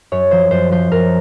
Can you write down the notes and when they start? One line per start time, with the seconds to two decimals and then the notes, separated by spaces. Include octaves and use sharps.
0.12 F#2 C#5
0.31 F3 C5
0.51 F#2 C5
0.71 F3 C5
0.92 F#2 A#4